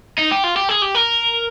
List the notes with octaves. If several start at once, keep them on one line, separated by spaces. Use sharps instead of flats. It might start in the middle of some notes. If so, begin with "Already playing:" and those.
D#4
G4
F4
G4
G#4
G4
A#4